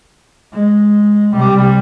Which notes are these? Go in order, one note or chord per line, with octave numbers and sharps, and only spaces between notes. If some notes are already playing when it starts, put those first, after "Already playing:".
G#3
C3 G3